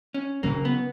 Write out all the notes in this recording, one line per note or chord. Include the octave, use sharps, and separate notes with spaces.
C#4
C#3 F#3 A#3 C#4
B3